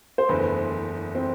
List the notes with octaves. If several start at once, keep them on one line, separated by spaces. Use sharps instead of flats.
C5
F#1 E2 D3 A3 B4
C4